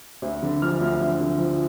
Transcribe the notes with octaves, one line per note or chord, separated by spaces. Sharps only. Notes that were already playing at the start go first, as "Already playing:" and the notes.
D2
D3
F3 F6
D2
D2
D3
F3